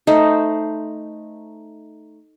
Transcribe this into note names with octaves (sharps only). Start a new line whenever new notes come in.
A3 D#4 C5